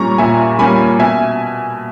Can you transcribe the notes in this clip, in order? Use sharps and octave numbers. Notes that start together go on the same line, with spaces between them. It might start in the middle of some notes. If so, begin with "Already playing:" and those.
Already playing: A#2 G3 A#3 C#4 A#5 C#6
A#2 E5 G#5
G3 A#3 C#4 G#5 B5
B2 E5 G#5